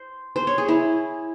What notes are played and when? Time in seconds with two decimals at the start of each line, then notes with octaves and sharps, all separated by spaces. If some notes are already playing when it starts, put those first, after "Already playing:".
Already playing: C5
0.36 C5
0.47 C#5
0.58 G#4
0.68 E4